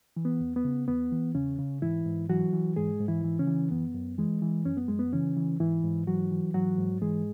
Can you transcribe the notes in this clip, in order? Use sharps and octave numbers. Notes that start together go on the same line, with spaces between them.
E3
B3
E2
B3
C#3
E2 B3
E3
E2 C#3 C#4
C#3
G#2 E3 E4
G#2
E3 F#3 F#4
E3
G#2 G#3 G#4
G#2
E3 E4
E3
C#3 C#4
E3
F#2 B3
F#2
E3 G#3
E3
F#2 C#4
B3
F#2 G#3
B3
C#3 E3 C#4
E3
G#2 E3 E4
G#2
E3 F#3 F#4
E3
G#2 F#3 F#4
G#2
E3 G#3 G#4